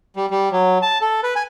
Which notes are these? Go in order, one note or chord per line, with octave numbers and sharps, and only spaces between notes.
G3
G3
F#3
A5
A4
B4
G#5